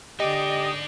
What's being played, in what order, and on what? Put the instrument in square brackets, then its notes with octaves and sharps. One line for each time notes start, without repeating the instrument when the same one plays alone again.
[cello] D3 D5 [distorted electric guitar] D#4 G#4 [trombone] G4 [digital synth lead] D#5